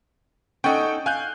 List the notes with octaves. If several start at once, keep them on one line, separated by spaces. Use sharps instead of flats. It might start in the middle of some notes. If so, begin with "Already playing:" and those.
C#4 D#4 A4 F#5 G5
F5 G#5 F#6 G6